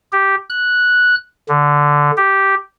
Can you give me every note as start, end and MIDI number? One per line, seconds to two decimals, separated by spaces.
0.12 0.36 67
0.50 1.15 90
1.49 2.11 50
2.17 2.55 67